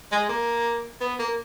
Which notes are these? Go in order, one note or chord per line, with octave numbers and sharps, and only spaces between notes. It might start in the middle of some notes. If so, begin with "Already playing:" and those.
G#3
A#3
B3
A#3